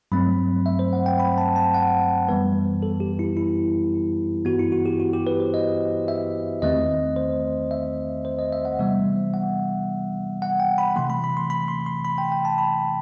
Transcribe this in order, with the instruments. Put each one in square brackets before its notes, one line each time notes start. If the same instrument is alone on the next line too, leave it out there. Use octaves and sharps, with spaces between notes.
[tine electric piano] G2 F#3 A3 C4 B5
E5
C5
F#5
G5
B5
A5
A5
F#5
F#2 E3 G3 B3 B4
A4
G4
E4
E4
G2 E3 B3 F#4
E4
F#4
G4
F#4
G4
B4
C5
D#5
E5
E2 D#3 A3 C4 D#5
C5
E5
C5
D#5
E5
F#5
C3 E3 G3 B3 E5
F#5
F#5
G5
B5
C3 E3 A3 C6
B5
B5
C6
B5
C6
C6
B5
G5
G5
A5
B5